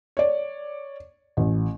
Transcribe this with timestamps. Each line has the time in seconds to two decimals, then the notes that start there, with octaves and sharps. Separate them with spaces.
0.17 C#5 D5
1.37 A1